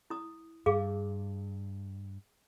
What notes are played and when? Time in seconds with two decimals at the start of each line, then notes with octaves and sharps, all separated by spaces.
0.10 E4 D#6
0.66 G2 G#4 F5 D6